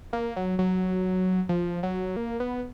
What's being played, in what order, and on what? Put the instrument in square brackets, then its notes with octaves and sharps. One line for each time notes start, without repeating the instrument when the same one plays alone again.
[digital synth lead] A#3
F#3
F#3
F3
F#3
A#3
B3